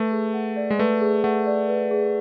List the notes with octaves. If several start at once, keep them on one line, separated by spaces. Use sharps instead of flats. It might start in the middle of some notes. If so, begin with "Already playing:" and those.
Already playing: A3 B4
G#4
F#5
D5
G#3
A3 B4
G#4
A3 F#5
D5
B4
G#4